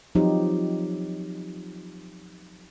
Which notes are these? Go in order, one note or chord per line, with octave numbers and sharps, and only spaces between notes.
F3 F#3 C4 D#4 F4 G4